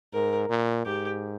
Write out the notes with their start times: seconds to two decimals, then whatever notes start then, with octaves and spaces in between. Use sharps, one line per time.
0.13 G#2 A#4
0.49 A#2
0.85 G#2 G4